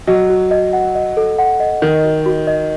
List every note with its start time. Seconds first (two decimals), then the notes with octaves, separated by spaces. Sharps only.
0.07 F#3 D#5
0.30 F#4
0.51 D#5
0.73 F#5
0.95 D#5
1.17 A4
1.38 F#5
1.60 D#5
1.82 D#3 D#5
2.04 F#4
2.26 F#4
2.47 D#5